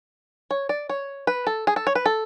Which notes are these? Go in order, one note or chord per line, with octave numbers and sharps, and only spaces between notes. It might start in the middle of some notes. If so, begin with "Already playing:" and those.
C#5
D5
C#5
B4
A4
G#4
A4
C#5
B4
A4